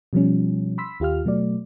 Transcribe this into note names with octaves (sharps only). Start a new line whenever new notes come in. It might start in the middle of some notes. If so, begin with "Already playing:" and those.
B2 F3 G3 C#4
B5 C6 E6 B6
D#2 F4 G4 F5 F6
B2 F#3 A3 D5